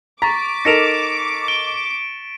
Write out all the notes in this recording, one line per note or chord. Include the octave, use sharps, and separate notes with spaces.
A#5 C#6 D6 A6 B6
D#4 A4 A#4 A#6 C#7 D7 E7 F7
D7 G7